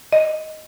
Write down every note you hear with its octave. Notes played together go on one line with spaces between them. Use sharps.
D#5